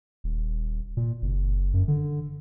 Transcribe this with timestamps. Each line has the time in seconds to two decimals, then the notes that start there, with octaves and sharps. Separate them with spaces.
0.24 D#1
0.97 A#2
1.22 F#1
1.74 F#2
1.88 D3